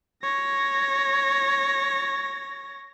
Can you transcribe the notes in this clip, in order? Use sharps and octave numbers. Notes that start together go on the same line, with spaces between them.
C#5 A#6